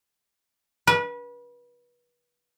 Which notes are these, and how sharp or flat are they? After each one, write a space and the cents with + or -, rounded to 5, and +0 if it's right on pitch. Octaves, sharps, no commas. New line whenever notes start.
B4 -30